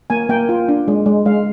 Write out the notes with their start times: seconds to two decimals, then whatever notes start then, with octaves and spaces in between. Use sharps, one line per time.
0.10 A#3 G#5
0.29 A#3 G5
0.49 F4
0.69 D4
0.88 G#3
1.06 G#3
1.26 G#3 F5